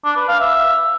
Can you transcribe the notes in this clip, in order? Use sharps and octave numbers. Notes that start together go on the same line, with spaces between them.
D4
B4
F5
E5